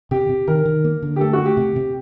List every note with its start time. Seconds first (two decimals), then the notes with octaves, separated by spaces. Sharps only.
0.11 C3 G4
0.29 C3
0.48 D#3 A#4
0.66 D#3
0.85 A#3
1.02 D3
1.16 G4
1.21 A3 A4
1.33 F#4
1.39 A3
1.46 G4
1.57 C3
1.76 C3